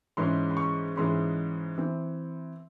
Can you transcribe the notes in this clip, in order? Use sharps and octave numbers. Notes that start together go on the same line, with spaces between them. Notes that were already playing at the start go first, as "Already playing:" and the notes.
G#2 E3 G#3 C#4 C6
C6
C#6
G#2 E3 G#3 C#4 C6
E3 C4